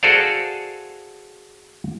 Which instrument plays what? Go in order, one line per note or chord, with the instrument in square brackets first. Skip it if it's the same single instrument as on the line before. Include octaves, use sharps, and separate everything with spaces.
[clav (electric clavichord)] F#4 G#4 A4 C5 D5 F5